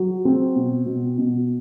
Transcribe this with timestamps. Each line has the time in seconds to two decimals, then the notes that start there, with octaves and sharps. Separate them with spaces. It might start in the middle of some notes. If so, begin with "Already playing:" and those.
Already playing: F#3
0.25 C4
0.55 B2
0.86 B2
1.18 B2